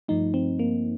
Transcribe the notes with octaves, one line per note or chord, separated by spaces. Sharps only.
G2 F3 A3 D#4
C4
A#3